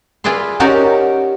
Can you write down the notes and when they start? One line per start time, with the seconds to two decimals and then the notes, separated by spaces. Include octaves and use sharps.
0.24 F4 G#4 B4 D5 E5 C6
0.60 C#4 D#4 F#4 G4 A#4 D5